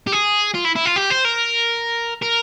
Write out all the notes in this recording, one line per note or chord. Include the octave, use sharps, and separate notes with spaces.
G4
G#4
F4
E4
E4
F4
G4
C5
A#4
A#4